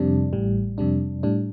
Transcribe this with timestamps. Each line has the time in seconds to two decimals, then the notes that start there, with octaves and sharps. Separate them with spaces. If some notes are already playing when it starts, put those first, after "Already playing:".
Already playing: F2 C3 G3 D4
0.33 A1 A2 G3
0.78 F2 C3 G3 D4
1.23 A2 G3 D4